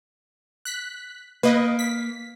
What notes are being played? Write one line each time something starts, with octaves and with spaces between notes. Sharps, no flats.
F#6 B6
A#3 B4 D#5
B6